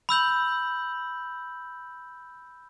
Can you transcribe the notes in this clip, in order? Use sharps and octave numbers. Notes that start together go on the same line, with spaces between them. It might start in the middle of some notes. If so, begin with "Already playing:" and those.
B5 E6 G6 F#7